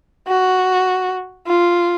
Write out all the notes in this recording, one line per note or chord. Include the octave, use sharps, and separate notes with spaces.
F#4
F4